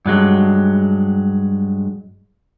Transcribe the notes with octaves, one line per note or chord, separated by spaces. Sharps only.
G2 F#3 G#3